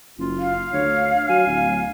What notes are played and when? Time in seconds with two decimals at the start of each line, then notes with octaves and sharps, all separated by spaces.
0.19 F#1 F4
0.38 F5
0.73 D2 C#5
1.29 F#3 G#5
1.47 D1